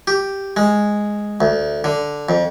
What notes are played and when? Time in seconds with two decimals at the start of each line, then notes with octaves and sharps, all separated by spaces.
0.07 G4
0.57 G#3
1.41 D2
1.84 D3
2.29 F2